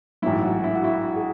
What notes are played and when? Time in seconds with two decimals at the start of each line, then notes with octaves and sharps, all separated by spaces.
0.22 A1 G#2 F#3 E4
0.43 F#4
0.64 E4
0.75 F#4
0.84 E4
1.16 G#4